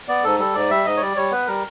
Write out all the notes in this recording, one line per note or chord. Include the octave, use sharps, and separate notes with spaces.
B3 D5
G#2 A4
G3 A4
G#2 D5
G3 E5
G#2 D#5
C#5
G3 D5
G3 C#5
B3 B4
G3 A#4